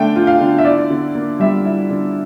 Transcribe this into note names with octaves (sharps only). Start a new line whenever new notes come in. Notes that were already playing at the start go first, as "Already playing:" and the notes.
Already playing: D3 A3 D4 G5 A5
F4
F5
D3
E5
E4 D5
D3
A#3
G3 E5
E4
D3